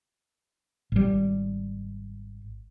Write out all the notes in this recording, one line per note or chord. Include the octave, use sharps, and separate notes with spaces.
G#1 G3